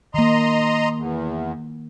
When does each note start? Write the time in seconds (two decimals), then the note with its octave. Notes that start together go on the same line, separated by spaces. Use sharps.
0.14 D#3 A#3 D#5 A#5 C6
0.97 E2